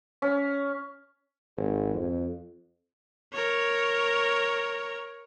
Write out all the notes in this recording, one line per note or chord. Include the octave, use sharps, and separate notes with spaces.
C#4
G#1
F2
A#4 C#5